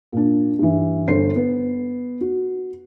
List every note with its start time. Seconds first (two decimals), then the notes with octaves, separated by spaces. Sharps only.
0.12 A#2 D4
0.59 G2 E3
1.08 G1 D4 C5 C7
1.36 B3
2.21 F#4